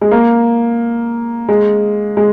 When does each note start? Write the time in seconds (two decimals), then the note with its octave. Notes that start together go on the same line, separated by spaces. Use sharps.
0.01 G#3
0.11 A#3
1.49 G#3
2.17 G#3